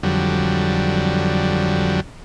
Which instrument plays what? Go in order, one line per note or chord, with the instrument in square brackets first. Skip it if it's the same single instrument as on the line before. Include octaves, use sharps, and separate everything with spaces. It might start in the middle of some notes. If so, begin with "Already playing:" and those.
[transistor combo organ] F2 D3 F#3 G3